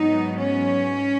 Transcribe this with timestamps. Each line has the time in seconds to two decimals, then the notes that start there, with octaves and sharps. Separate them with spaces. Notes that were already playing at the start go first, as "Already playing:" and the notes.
Already playing: G#2 F#3 B3 D#4
0.39 C#4